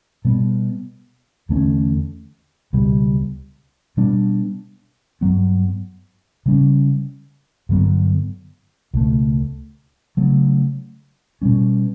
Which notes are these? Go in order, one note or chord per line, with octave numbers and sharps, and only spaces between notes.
B2 G3 B3
E2 D3 A3 C#4
C#2 B2 G3
B2 G3 B3 D4
G2 F#3 B3
C#3 G3 C#4
G2 D3 F#3 B3
C#2 B2 A3
C#3 F#3 A3
B2 G3 C#4